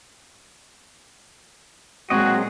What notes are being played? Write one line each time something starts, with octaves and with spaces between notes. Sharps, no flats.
A#2 F#3 G#3 C4 F#4 G#4 D#5